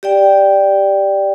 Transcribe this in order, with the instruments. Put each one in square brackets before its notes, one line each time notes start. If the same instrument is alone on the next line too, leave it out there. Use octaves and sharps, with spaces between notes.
[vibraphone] G4 D5 G5